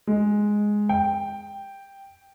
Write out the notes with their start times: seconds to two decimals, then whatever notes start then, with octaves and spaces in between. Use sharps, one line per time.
0.07 G#3
0.89 G5